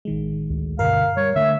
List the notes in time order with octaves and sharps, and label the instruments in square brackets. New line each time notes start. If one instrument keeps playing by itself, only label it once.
[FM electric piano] A1 D#3 G#3
[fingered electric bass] D2
[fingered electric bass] G2 B2 D3 [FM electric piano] A#4 [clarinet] F5
[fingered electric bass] G3 [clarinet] C#5
[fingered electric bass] D3 A3 [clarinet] E5